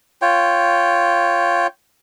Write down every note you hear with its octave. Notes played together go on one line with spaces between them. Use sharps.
F4 C#5 G5